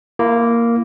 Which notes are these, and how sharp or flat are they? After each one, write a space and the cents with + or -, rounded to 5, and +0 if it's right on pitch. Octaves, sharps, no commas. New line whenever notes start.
A#3 +0 E4 +35